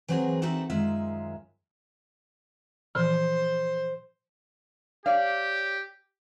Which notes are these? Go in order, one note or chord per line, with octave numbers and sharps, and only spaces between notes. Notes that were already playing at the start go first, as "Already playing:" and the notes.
E3 F#3 C4 F#4 G#4 A#4
C4 D4 D#4 F#4 A4 E5
F#2 D#3 G#3 F4 E5
A#2 E3 F3 C5
G4 C#5 D5 F5